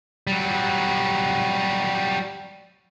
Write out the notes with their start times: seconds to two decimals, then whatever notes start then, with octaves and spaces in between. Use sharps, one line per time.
0.27 F#3 G3